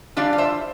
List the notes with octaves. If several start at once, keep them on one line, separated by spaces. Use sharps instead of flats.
E3 G3 D4 F4 D5 F5
F5
C5 E5